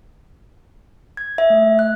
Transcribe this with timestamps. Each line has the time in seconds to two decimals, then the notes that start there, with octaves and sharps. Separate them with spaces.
1.17 G#6
1.38 E5
1.50 A3
1.79 F#6